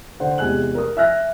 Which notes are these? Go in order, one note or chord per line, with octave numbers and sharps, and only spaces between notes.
D3 C5 F#5
E2 C3 G#3 G#5 F#6 F#7
A#4 D#6
E5 G#5 F6 F#6 A#6